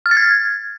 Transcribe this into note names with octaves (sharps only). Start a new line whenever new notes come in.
F6
A6
G#6